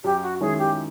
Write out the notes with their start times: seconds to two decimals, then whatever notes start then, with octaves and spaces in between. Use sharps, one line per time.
0.04 F#2 G4
0.22 F#4
0.41 D#3 G#3 C#4 E4 G#4
0.59 G4